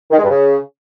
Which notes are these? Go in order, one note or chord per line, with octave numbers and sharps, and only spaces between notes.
D#3
G#3
G2
C#3